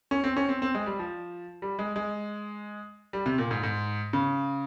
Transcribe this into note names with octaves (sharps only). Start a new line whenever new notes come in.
C#4
C4
C#4
C4
C4
G#3
G3
F3
G3
G#3
G#3
G3
C3
A#2
G#2
G#2
C#3